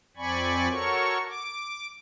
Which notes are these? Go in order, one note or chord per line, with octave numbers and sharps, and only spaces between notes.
F2 C4 D5 G#5 B5 C#6
F#4 A4 A#4 C#5 C#6
D6